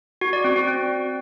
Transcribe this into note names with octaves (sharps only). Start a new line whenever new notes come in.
F#4
D5
C4
F#4
C4